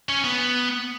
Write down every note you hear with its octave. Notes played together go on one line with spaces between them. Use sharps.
C#4
B3